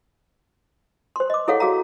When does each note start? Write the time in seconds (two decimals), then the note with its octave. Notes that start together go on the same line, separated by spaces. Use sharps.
1.16 C5 C6
1.30 D#5 D6
1.48 E4 G#4 A4 C#5 F5 F#5
1.60 F#4 G#4 F5 A#5